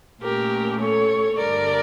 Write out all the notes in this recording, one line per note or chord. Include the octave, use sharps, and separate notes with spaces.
A#2 A3 C#4 G4 A#4
A4 C#5
G2 D3 G3 A#4 D5